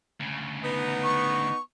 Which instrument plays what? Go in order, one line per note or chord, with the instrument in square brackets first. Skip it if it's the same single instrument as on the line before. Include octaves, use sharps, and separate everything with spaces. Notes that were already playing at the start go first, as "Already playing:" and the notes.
[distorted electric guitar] D2 C#3
[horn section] B3 D#4
[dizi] C#6